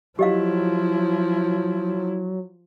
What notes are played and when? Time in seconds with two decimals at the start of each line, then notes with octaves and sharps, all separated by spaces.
0.19 F3 F#3 E4 G4 D#5 F5